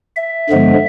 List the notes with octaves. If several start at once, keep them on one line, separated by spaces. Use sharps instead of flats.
E5
G2 D3 F3 G#3 B3